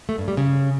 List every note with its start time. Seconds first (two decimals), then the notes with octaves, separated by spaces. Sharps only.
0.09 A3
0.18 G2
0.28 G3
0.37 C#3